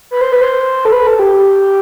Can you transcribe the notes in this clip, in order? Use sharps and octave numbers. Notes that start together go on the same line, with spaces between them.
B4
C5
B4
C5
A4
B4
A4
G4